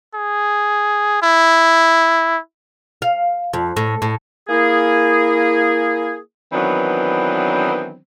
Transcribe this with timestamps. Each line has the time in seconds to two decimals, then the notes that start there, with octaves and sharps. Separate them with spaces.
0.15 G#4
1.22 E4
3.02 F5
3.53 F2
3.77 A2
4.02 A2
4.49 A#3 E4 G#4
6.53 D#3 E3 F#3 B3 C4 D4